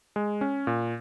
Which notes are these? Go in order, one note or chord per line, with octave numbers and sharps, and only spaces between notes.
G#3
C#4
A#2